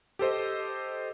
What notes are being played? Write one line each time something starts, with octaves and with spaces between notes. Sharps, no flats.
G4 A4 C5 D#5